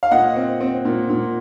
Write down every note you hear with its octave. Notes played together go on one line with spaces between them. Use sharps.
F5
A#2 D#5 F#5
C4
C4
A#2
A#2